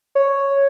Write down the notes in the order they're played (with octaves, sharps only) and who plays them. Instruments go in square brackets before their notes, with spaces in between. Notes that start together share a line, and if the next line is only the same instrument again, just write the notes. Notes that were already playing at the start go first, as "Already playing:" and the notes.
[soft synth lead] C#5